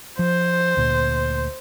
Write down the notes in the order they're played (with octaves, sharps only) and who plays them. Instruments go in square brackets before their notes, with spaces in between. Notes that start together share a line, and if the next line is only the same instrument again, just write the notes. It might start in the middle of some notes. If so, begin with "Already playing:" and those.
[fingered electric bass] F3 [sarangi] C5
[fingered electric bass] D2 A#2